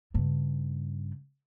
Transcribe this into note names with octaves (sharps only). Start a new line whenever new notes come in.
G2 C#3